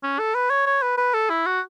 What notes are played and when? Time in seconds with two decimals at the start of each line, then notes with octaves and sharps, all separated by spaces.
0.03 C#4
0.19 A4
0.35 B4
0.50 C#5
0.67 C#5
0.82 B4
0.98 B4
1.14 A4
1.30 E4
1.46 F#4